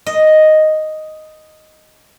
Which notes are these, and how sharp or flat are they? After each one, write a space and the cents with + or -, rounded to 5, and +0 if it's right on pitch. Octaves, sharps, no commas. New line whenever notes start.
D#5 +0